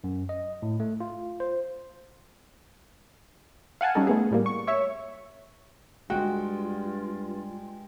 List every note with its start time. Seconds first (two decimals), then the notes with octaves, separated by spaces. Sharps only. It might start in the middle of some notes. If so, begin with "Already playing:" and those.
0.04 F#2
0.29 D#5
0.62 A2
0.80 A3
1.00 F4
1.40 C5
3.81 F5 F#5 G#5 A5
3.95 G3 C#4 D#4 A4
4.07 A3 B3 G#4
4.31 A2 G3 A#3
4.46 C#6
4.67 C#5 E5 C#6
6.10 G2 G#3 F4 F#4 G5